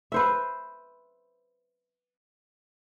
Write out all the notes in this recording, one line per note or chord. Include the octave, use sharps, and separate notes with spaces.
B4 C5 E5